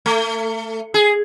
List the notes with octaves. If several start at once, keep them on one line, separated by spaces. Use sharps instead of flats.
A3
G#4